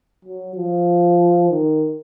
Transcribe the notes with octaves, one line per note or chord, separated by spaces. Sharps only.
F#3
F3
D#3